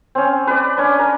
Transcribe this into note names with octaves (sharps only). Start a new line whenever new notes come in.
C4 C#4
B4 D5
C#4 D4
A#4